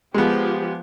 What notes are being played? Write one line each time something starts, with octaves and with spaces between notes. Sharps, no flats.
F3 G#3 B3 G4